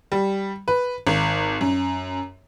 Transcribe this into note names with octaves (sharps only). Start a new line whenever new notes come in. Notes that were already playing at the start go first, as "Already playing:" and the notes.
G3
B4
G#1
F#2